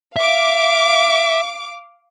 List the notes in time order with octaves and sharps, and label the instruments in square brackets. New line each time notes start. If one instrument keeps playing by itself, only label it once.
[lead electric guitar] E5 [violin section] F5 D6